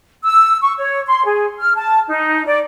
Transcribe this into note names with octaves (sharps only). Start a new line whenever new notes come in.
E6
C#6
C#5
C6
G#4
F6
A5
D#4
D5